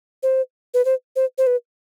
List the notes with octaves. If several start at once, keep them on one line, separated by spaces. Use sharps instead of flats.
C5
B4
C5
C5
C5
B4